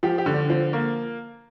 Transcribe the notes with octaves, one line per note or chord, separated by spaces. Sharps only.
F3 G4
G4
D3
D4
F3 C4
A#3